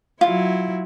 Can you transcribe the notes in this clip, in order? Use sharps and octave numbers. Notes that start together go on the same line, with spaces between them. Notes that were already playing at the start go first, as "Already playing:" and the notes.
F#3 E4 F4